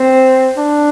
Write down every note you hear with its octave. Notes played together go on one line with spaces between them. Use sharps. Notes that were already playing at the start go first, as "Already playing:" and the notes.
Already playing: C4
D4